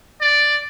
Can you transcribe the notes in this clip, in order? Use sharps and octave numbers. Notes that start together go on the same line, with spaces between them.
D5